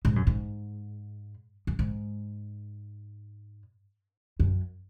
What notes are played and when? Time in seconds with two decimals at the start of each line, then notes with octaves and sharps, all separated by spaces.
0.05 G#2
0.16 F#2
0.27 G#2
1.67 F#2
1.79 G#2
4.40 F#2